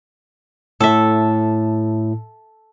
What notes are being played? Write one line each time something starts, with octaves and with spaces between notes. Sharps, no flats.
A2 A4 E5